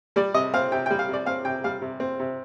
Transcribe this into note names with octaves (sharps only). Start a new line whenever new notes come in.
G3 D5
C3 D#5
C4 F5
C3 G5
G3 G5
F5
C3 D5
C4 F5
C3 G5
G3 F5
C3
C4
C3